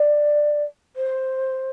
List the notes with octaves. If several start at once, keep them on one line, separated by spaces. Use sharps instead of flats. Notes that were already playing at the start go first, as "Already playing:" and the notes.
Already playing: D5
C5